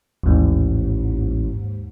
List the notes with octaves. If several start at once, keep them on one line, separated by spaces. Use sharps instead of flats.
A1 D#2 G#2